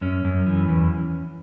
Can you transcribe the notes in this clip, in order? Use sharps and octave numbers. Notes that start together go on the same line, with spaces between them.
F#2 C#4
F#2
E3
E2